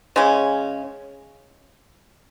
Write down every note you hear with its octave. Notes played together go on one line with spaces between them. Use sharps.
C#3 G#3 C#4